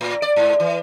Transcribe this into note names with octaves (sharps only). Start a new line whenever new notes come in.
A2
D5
G#2
E3